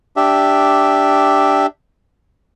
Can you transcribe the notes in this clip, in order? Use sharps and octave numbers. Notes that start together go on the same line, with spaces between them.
D4 G4 E5